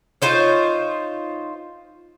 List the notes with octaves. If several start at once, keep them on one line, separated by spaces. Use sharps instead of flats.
D#4 F4 C5 C#5